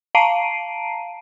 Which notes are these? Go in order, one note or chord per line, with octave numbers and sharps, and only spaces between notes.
F5 A5 A#5 C7 D7 D#7